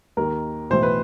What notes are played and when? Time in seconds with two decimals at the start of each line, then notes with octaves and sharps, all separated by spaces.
0.17 D#2 D#3 A#4
0.70 B1 A2 E3 C5
0.83 B4